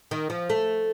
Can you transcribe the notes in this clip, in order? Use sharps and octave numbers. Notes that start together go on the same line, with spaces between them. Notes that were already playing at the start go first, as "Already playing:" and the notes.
D#3
F3
A3